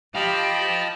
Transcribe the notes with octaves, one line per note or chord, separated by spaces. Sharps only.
G4 C5 D#5 F5 G5 A5 B5